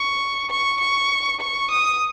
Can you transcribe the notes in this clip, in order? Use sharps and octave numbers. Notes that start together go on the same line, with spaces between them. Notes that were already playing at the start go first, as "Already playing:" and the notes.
Already playing: C#6
C#6
C#6
C#6
D#6